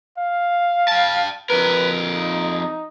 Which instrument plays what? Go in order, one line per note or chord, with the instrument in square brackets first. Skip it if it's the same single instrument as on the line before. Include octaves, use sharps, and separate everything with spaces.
[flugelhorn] F5
[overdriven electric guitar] G5 A5
[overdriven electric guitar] F2 A#4 [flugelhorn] B4
[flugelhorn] D#4